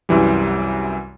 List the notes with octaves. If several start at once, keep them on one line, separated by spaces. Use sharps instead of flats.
C2 F#2 E3 G3